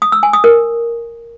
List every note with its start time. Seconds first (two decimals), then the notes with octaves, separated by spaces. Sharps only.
0.02 D#6
0.12 E6
0.23 G#5
0.33 D#6
0.44 A#4